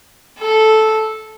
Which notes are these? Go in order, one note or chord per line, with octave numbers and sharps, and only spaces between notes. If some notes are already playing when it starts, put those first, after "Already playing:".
A4